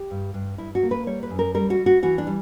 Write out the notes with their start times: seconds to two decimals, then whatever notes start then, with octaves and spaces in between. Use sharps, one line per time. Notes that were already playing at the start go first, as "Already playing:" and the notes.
Already playing: G4
0.11 G2
0.34 G2
0.58 G2 E4
0.75 F#4
0.83 A#3
0.91 B4
1.06 G3 C#5
1.23 B4
1.31 F#2
1.39 A#4
1.54 G3 A#4
1.70 F#4
1.79 G3
1.86 F#4
2.03 E3 F#4
2.18 D4
2.27 G3